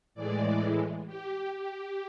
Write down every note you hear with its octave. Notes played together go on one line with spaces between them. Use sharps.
A2 E3 G#3 D5
G4
G4